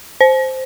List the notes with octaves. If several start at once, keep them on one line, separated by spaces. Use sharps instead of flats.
C5